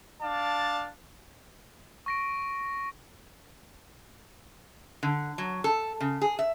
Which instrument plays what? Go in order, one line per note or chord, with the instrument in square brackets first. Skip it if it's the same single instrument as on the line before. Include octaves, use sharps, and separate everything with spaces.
[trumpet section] D4 D5 F5 A5
[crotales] C#6 A#6 D7
[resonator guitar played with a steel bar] D3
F#3
A4
C#3
G#4
E5